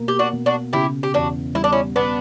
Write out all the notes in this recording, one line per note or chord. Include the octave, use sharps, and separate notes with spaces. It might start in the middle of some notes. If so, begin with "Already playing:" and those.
Already playing: B2 A#3
G4
D4 F#4
B2
D4 F#4
C#3 E4 G4
G4
E2 D4 F#4
G3 E4
D4
C#4 E4
B3 D4